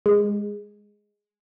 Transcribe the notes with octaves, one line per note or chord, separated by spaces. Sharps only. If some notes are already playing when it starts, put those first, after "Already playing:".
G#3